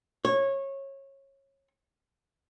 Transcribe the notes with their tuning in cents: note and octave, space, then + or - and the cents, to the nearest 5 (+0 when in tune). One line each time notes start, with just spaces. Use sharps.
C#5 -20